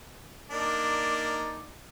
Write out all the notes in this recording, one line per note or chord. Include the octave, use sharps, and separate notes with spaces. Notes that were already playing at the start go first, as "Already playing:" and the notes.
A#3 D4 D#4 D5